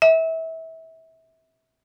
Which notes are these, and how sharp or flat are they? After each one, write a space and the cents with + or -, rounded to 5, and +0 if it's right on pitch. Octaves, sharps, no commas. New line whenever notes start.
E5 -25